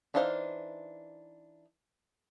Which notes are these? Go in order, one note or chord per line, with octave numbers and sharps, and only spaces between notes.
E3 D4 D#4 C5 F5